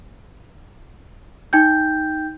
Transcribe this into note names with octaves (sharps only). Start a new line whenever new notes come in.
D#4 G5 G6